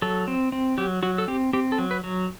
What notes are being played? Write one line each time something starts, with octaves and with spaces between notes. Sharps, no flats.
F#3 A4
C4
C4
F#3 G4
F#3 F#4
A4
C4 G4
C4 G4
A4
F#3
B4
F#3